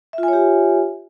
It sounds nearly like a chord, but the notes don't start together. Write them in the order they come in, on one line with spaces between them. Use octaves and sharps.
E5 F4 G#5 C#5 G4